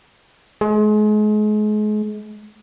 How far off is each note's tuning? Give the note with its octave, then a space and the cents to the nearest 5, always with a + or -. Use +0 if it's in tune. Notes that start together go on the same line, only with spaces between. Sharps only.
G#3 +35